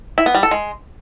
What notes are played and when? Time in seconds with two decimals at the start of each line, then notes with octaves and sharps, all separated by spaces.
0.18 E4
0.26 B3
0.35 G3
0.43 A4
0.51 G#3